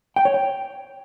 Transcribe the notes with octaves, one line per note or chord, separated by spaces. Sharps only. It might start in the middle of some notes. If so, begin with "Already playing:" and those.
G5
C#5
G5